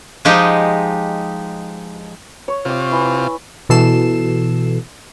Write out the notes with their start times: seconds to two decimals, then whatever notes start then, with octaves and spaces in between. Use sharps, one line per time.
0.25 F3 G#3 D#4 G4
2.48 C#5
2.65 C3 F4 C#5 D6
2.92 E3
3.69 B2 E3 A4 C7 E7